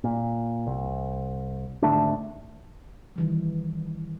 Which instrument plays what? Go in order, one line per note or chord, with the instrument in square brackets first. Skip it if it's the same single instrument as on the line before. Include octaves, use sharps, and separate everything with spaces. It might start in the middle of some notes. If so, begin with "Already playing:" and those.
[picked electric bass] A#2
C2
G#1 D3 A3 D4
[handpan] D#3 E3 G3